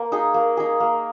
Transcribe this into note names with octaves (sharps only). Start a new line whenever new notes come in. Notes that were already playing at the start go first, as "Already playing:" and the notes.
Already playing: A#3
D#4 G#4
A#3
D#4 G#4
A#3